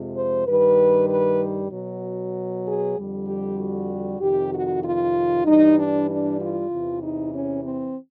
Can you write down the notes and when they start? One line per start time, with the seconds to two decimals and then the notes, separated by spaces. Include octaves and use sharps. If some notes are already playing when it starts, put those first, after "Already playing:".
Already playing: F2 C3 F3 G#3
0.14 C5
0.45 G2 D#3 G3 B4
1.08 B4
1.70 B2 F#3
2.65 G#4
2.96 F2 D3 G3
3.27 G4
3.57 F#4
4.20 F2 C3 D#3 G4
4.52 F#4
4.83 F4
5.45 G2 E3 G3 D#4
5.76 D4
6.08 D4
6.39 F4
6.70 E2 C3 E3
7.01 D#4
7.32 C#4
7.63 C4